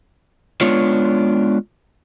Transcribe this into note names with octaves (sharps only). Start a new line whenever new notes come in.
G#3 B3 D4 F4 C#5